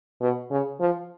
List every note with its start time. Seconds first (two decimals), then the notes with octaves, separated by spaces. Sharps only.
0.21 B2
0.51 C#3
0.80 F3